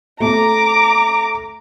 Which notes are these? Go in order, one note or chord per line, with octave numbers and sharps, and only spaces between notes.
A3 A#5 D6